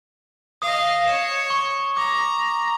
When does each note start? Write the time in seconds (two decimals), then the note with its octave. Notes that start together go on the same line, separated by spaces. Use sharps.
0.62 D#5 F5 D#6
1.07 C#5 E7
1.50 C#6
1.97 A#5 D6